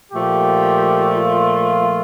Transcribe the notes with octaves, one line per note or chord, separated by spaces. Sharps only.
A#2 F3 A3 G4
F4